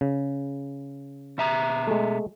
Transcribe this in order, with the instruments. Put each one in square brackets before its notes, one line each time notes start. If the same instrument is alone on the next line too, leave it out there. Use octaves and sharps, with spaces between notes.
[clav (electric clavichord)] C#3
[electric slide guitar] B2 E5 A#5
[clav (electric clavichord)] G#3 A3